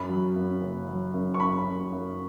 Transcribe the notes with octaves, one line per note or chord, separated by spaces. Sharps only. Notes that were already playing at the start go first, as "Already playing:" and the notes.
Already playing: F#2 B5
F#3
F#2
F#1
F#3
F#2
C#6
F#2 B5
F#2
F#2